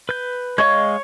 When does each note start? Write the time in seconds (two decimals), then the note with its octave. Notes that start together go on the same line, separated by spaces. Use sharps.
0.09 B4 G6
0.58 G#3 C#5 D#5 F5